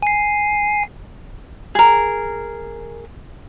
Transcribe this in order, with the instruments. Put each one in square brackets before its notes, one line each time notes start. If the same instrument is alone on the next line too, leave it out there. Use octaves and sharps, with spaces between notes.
[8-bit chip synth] G#5 C7
[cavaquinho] G#4 A#4